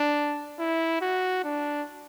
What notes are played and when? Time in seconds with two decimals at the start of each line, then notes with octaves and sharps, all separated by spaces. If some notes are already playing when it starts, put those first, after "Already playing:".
Already playing: D4
0.59 E4
1.01 F#4
1.44 D4